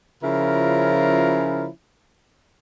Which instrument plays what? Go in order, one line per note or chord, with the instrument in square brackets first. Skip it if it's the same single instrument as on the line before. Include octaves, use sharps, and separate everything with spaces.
[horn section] C#3 F3 C#4 E4 F4 A#4